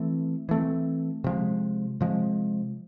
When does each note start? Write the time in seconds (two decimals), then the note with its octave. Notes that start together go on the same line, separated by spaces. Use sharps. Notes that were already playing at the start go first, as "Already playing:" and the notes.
Already playing: E3 A3 C4
0.49 E3 A3 C4
1.24 C3 F3 G#3
2.01 C3 F3 G#3